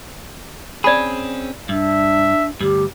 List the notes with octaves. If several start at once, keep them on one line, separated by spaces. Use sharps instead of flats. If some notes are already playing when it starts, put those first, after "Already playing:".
C4 C#4 G#4 D5 B5
G2 D4 E5
D2 G2 G4